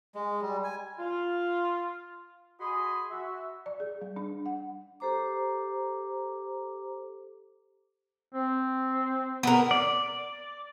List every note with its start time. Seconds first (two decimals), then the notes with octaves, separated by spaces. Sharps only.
0.15 G#3
0.42 G3
0.64 G#5
0.98 F4
2.60 F#4 G#4 D#5 G#5 B5 C6
3.10 F#4 E5
3.66 D5
3.80 G#4
4.01 G3
4.16 D4
4.46 F#5
5.00 G4 A4 C5 A#5 D6
8.34 C4
9.43 B3 A#4
9.71 D5